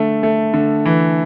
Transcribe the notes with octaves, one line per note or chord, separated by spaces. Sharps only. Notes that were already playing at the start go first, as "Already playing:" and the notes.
Already playing: D3 A3
A3
D3
E3